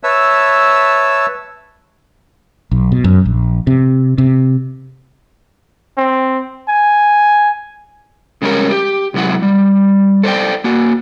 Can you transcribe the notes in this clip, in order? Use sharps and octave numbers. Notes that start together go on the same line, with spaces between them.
B4 C#5 E5 A5 E6
B1
B2
F#2
A#1
C3
C3
C4
G#5
C#3 G3 G#3 C#4 A#4
G4
C3 F#3 G#3 E4 F#5
G3
A4 C5 D5 G5
A#3 F#4